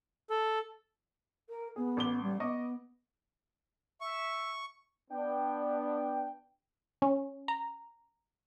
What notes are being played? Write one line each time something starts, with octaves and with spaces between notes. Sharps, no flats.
A4
A#4
B3 G#4
A1 D6 G7
G3
B3 D#5 C#6 D6
E5 C#6
B3 D4 G5
C#4
A#5